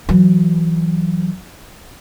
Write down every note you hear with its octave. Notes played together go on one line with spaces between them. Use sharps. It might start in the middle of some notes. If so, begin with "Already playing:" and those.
E3 F#3